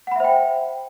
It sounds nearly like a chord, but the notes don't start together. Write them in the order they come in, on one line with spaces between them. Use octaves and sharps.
F#5 B5 E5 C5 G5